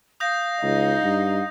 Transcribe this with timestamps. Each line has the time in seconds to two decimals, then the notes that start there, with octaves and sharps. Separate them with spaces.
0.20 F5 D#6 G6 A#6
0.63 C#2 D#4
1.03 G2